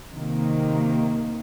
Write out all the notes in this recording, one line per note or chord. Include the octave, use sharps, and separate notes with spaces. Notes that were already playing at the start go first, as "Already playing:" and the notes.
C3 D#3 A#3